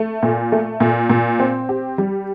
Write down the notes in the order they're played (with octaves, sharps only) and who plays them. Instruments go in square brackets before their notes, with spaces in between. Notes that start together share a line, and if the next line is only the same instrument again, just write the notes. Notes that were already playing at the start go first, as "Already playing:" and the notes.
Already playing: [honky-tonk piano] A3
A#2
A3
A#2
A#2
C4
G4
G3